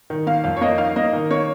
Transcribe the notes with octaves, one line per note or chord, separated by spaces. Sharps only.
D#3
A#3 F5
F2 F5
C#5
A#3 D#5
D#4 F5
A#3 D#5
D#3
A#3 C#5